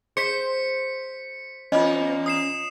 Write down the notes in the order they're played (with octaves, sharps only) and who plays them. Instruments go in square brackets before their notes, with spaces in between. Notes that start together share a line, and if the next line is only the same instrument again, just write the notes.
[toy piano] G#4 [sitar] C5 [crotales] B6 C#7
[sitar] E2 A#3 [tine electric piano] C#4 [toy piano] F4 D#5
[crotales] D#6 C7 E7